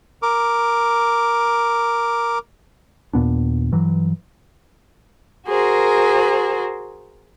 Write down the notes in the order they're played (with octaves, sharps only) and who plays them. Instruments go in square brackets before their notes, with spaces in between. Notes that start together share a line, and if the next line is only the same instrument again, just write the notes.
[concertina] A#4 D6
[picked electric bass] D#2 A#2 B3 D4
G2 E3 F#3
[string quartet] F#4 G#4 A#4 C5